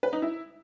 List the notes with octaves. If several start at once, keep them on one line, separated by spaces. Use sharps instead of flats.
B4
D#4
E4